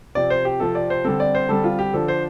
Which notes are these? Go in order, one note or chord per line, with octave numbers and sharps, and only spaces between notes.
C3 F3 C4 D5
C5
G4
C3 F3 C4 A4
D5
C5
D3 G3 C4 A4
D5
C5
D3 G3 C4 A4
F4
G4
D3 F3 D4 A4
C5